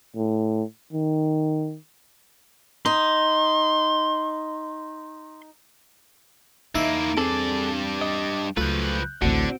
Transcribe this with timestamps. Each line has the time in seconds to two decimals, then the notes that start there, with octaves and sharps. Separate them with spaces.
0.16 A2
0.93 D#3
2.86 D#4 C6
6.75 E2 A#3 D#4 E4 E5
7.17 G2 C4 G#4 A4 D5
8.02 D#5
8.57 C#2 F3 F#3 A3 F4 B4 F#6 G6
9.22 A1 D2 D3 C4 F#4